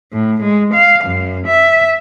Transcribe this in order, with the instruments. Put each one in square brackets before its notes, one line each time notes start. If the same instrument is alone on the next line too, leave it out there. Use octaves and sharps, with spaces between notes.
[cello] A2
G#3
F5
F#2
E5